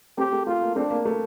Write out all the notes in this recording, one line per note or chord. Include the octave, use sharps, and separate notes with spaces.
A3 C4 G4
A3
A3 F4
A#3
A3 C4 D4
A#3
A3